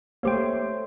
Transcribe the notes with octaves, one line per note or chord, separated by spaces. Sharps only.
A3 A#3 G4 C5 C#5 G5